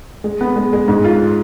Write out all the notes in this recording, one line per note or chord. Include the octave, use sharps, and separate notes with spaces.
G#3
B3
G#3
G#3
G#2
F4